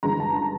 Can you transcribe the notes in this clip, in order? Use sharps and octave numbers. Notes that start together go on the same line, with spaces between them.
G1 G2 E3 G#3 A#5
A5
A#5